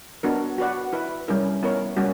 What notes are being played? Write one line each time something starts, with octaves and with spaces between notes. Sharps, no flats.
B3 D4 F#4 A#4
F#4 B4 D5 F#5
E4 B4 E5
G3 C#4 E4 A#4
B3 E4 A#4 C#5
G3 A#3 C#4 F#4